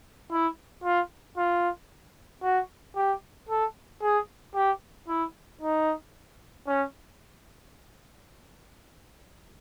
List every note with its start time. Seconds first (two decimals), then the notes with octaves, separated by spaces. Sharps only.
0.31 E4
0.84 F4
1.37 F4
2.44 F#4
2.96 G4
3.49 A4
4.02 G#4
4.55 G4
5.08 E4
5.61 D#4
6.67 C#4